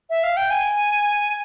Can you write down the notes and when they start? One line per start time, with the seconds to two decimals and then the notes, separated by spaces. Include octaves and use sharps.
0.10 E5
0.23 F5
0.37 G5
0.50 G#5